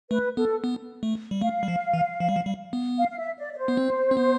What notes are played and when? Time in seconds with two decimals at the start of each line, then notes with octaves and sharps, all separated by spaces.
0.11 A3 B4
0.37 B3 A4
0.64 B3
1.03 A3
1.31 G3
1.41 A3 F5
1.63 G3
1.68 F3
1.93 E3
2.20 F3
2.29 G3
2.36 F3
2.46 G3
2.73 B3
2.98 F5
3.11 F5
3.18 E5
3.38 D5
3.53 D5
3.57 C5
3.68 B3
3.77 C4
4.11 C4
4.17 B3